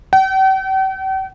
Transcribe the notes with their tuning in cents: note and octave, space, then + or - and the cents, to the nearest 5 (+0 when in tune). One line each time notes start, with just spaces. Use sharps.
G5 -45